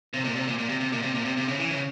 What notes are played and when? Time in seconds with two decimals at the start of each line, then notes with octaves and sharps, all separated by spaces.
0.14 C3
0.25 A#2
0.36 C3
0.48 A#2
0.59 A#2
0.69 C3
0.80 C3
0.92 A#2
1.02 C3
1.15 A#2
1.25 C3
1.37 C3
1.48 C#3
1.59 E3
1.71 C#3